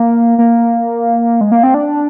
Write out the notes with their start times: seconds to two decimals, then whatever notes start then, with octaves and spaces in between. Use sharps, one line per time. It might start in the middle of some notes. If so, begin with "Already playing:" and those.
Already playing: A#3
0.38 A#3
1.41 G#3
1.52 A#3
1.63 C4
1.74 D4